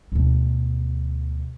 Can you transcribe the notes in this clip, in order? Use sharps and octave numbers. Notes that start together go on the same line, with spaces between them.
D2 B2